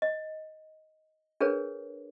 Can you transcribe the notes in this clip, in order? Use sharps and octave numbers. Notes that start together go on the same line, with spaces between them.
D#5
D4 G#4 A#4 B4 C#5